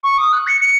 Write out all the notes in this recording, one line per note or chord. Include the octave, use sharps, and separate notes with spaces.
C#6
D#6
F#6
C#7
C#7